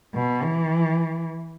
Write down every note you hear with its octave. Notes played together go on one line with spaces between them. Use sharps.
B2
E3